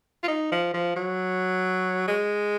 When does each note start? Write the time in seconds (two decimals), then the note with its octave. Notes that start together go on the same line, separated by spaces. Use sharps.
0.23 F4
0.28 D#4
0.52 F3
0.74 F3
0.96 F#3
2.08 G#3